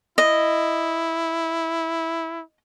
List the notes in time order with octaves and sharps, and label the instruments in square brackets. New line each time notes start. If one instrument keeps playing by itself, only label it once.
[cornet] E4 [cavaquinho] D#5